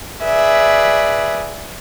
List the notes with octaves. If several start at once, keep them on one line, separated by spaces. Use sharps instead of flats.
G#4 B4 D5 E5